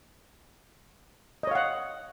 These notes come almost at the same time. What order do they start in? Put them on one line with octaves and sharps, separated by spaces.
D#5 C#5 F5 F#5